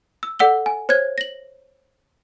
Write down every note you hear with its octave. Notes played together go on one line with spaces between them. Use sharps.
E6
A4 D5 F#5 E6 G7
G#5
C5 C#5 F#6 G#6
A#6 F#7